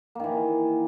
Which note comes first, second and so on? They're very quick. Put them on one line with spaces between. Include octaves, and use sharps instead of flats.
A#3 D#3 E3